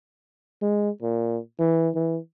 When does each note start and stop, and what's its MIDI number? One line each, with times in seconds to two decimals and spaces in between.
0.62 0.89 56
1.02 1.38 46
1.59 1.89 52
1.95 2.18 52